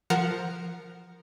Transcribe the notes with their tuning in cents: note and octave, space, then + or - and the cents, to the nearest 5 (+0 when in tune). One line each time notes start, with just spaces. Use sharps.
F3 +0 A#4 +0 F#5 +0